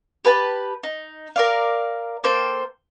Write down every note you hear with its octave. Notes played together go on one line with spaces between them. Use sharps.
G4 B4 G#5 A5
D#4
A#4 D5 F5
A#3 A4 C5 G5